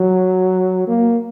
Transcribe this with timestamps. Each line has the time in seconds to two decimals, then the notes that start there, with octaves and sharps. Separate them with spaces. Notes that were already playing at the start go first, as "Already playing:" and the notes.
Already playing: F#3
0.88 A#3